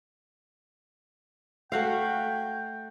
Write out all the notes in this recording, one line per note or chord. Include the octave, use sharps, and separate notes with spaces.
A3 F#4 F5 G5